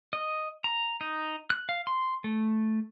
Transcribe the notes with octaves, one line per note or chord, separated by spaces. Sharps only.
D#5
A#5
D#4
F#6
F5
C6
A3